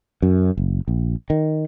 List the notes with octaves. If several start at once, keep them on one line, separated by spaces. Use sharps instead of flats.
F#2
F#1
A#1
D#3